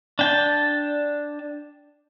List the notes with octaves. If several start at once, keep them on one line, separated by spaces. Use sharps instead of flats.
D4 G5 A5